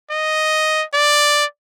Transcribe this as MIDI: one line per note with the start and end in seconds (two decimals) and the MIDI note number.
0.11 0.84 75
0.94 1.45 74